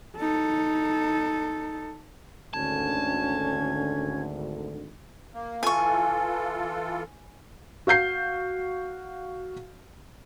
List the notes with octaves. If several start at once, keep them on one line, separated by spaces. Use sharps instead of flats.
D#4 A4
G#1 D2 D3 C#4 A5 G#6
A#3
E3 F4 A4 G#5 C#6
F#4 F5 G6 C7